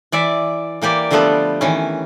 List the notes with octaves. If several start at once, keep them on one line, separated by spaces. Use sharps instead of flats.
E3 D5 E5
E3 A#3 G4 D5
D3 F3 G3 A3 B3 A4
D#3 E3 C#4